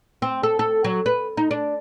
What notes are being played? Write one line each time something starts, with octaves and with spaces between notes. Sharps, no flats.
C4
A4
A4
F#3
B4
D#4
D4